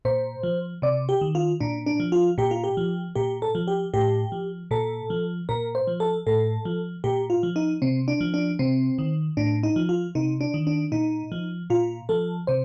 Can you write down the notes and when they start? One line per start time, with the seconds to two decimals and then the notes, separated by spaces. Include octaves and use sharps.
0.05 A#2 C5
0.43 F3
0.82 C3 D5
1.09 G4
1.21 D#3
1.35 F4
1.60 A#2 D4
1.86 D4
2.00 F3
2.12 F4
2.38 A#2 G4
2.51 F4
2.64 G4
2.77 F3
3.16 A#2 G4
3.42 A4
3.55 F3
3.68 G4
3.94 A2 G4
4.32 F3
4.71 A#2 A4
5.10 F3
5.49 A#2 A#4
5.75 C5
5.87 F3
6.00 A4
6.27 A2 A4
6.65 F3
7.04 A#2 G4
7.30 F4
7.43 F3
7.56 D#4
7.82 C3 C4
8.08 D4
8.21 F3
8.34 D4
8.59 C3 C4
8.98 D#3
9.37 A2 D4
9.63 D#4
9.76 F3
9.89 F4
10.15 C3 D#4
10.41 D4
10.54 D#3
10.67 D4
10.92 A#2 D#4
11.32 F3
11.70 A#2 F4
12.09 F3 A4
12.47 C3 C5